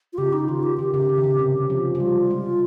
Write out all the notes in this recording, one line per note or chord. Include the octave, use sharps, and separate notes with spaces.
F4
C#3 G4
D#4
D#3 F4
G4
D#3 G4
C#3
C#3
D#3
C#3
C3
F3
F3
G3 F4
G#3